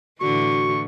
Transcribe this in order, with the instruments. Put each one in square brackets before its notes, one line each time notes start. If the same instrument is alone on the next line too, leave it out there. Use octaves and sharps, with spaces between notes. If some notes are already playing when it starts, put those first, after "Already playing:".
[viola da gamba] A2 D3 E3 [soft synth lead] F#4 [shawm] C#6